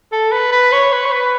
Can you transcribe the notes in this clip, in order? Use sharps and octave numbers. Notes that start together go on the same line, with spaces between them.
A4
B4
B4
C#5
B4
C#5
B4